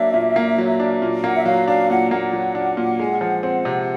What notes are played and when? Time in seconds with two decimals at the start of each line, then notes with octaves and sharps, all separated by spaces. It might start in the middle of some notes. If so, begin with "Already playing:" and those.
Already playing: F#3 A#3 D4 E5
0.14 A#2
0.36 A#3
0.58 F#3
0.80 D4
1.02 A#2
1.24 A#3 F#5
1.36 E5
1.46 F#3 F5
1.68 D4 F5
1.89 A#2 F#5
2.11 A#3 F#5
2.33 F#3
2.55 D4
2.77 A#2
2.99 G#3
3.21 F3
3.43 C4
3.65 C3